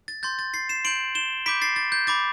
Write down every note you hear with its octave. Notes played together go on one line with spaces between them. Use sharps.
A6
C6 G6 A6
A6
A6 C7
C7 E7
C6 G6 D7 F#7
E7 G7
B5 D6 G6 B6 D7
A6 C7
A6
G6
B5 D6 G6 A6